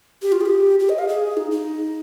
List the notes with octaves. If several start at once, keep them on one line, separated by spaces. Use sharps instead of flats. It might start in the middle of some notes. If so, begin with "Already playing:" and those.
G4
F4
G#4
G4
G4
D#5
F5
G#4
D#4
D#4